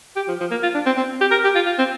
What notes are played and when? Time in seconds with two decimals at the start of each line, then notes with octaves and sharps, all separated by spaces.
0.16 G4
0.28 F3
0.40 F3
0.51 A#3
0.63 F4
0.74 D4
0.86 C4
0.97 C4
1.21 G4
1.31 A#4
1.44 G4
1.55 F4
1.66 F4
1.79 C4